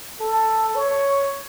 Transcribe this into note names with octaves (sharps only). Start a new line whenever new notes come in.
A4
C#5